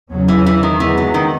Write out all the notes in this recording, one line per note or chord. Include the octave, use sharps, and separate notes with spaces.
E2 C#3 F#3 C#4
E3
E3
D#3
E2 D#3 E3 G#3 B3
F#3
D#3